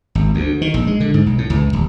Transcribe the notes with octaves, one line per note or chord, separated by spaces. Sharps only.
G#1
D2
D#3
A#1
G#3
D3
G#2
B1
A2
C#2
D#1